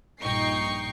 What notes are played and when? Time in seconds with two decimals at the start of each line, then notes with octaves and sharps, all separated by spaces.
0.22 A#1 G2 D#4 G5 C#6 C7